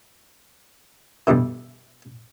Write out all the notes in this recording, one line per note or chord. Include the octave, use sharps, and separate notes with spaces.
G2 B2 D3 E3